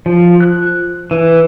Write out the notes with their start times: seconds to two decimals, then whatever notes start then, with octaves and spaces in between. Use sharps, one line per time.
0.06 F3
0.40 F#6
1.11 E3